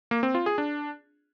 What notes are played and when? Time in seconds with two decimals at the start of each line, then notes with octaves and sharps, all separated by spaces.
0.11 A#3
0.23 C4
0.35 F4
0.46 G#4
0.58 D4